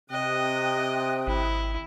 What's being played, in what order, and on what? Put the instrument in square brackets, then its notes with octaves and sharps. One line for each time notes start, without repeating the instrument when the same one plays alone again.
[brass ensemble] C3 [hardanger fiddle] D#5 [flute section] G5 D#6 F#6
[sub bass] G#1 [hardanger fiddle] E4